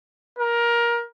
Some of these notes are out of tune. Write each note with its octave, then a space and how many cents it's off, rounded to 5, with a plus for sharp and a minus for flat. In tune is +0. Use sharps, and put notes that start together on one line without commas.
A#4 +20